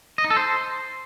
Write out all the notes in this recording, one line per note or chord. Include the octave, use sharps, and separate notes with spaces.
D#5
D#4
A4
C5